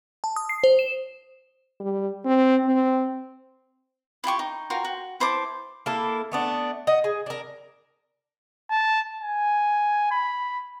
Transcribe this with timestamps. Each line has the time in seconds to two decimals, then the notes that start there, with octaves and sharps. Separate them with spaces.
0.24 A5
0.36 D#6
0.49 C7
0.64 C5
0.79 E7
1.80 G3
2.25 C4
2.64 C4
4.24 E4 F4 G4 C#6
4.39 D#4
4.70 F4 F#4 A#4 G5
4.85 F#4
5.20 E4 C5 A5 D6
5.86 A#3 E4 A4
6.32 A3 B3 D4
6.87 D#5 F#5
7.04 G#4
7.26 D4 A#4
8.70 A5
9.21 G#5
10.11 B5